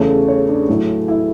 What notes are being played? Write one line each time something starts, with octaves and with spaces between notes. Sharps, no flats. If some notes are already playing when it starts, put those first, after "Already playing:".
Already playing: E2 C#3 E3 A3 C#5
C#5
D4
A2 F#3 A3 E4
E4